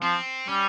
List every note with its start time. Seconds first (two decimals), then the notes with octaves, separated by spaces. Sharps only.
0.02 F3 C4
0.49 G3 C#4